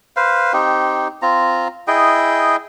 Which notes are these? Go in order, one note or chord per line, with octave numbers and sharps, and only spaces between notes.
B4 C5 F5
C4 D#4 G4
C4 F4 A#5
E4 G#4 D#5 G5